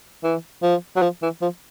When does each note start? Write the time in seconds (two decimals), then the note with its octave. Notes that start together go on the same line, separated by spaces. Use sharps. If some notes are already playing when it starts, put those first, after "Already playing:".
0.24 E3
0.63 F3
0.96 F#3
1.02 F3
1.22 E3
1.41 F3